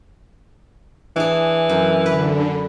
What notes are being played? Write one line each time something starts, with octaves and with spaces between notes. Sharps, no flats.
E3 D4 G#4
F#2
D3 B4